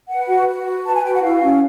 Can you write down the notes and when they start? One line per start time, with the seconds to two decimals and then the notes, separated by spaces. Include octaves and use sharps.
0.09 B4 F#5
0.29 F#4
0.47 F#4
0.66 B4
0.85 B4 A5
0.96 G#5
1.04 F#4 G5
1.14 F#5
1.23 E4 F5
1.42 C#4